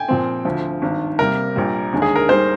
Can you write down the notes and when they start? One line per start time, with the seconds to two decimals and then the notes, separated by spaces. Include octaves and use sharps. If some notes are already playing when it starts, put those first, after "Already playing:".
Already playing: G5 G#5
0.08 A#2 F3 C4
0.45 D2 D3 F3
0.82 G#1 G2 D#3
1.19 C3 G3 A#3 A#4
1.56 A#1 A#2 G3
1.93 D#2 D3 G#3
2.02 G#4
2.16 A#4
2.29 D#2 D#3 G3 C5